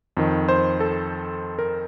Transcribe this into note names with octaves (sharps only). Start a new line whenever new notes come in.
F2 D#3
C5
A4
A#4